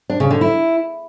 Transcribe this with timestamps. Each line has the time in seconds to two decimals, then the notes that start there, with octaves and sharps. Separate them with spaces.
0.10 D4
0.20 C#3
0.31 D3
0.41 E4